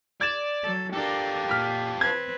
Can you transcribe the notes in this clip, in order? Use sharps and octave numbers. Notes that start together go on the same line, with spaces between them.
D5 G#6 A6 E7
F#3 A4
D4 F4 G4 A4 A#4
A#2 F6 B6
C4 B4 G#6